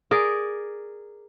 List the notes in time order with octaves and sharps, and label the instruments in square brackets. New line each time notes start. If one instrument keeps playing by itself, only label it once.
[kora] G#4 A#4 D5